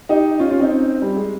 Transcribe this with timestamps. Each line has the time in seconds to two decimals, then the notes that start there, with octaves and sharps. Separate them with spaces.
0.09 D#4 G4
0.39 C#4 F4
0.50 C#4 F4
0.60 C4 D#4
1.02 G3
1.17 G#3